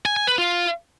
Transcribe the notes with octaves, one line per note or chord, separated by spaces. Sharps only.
G#5
G#5
B4
F4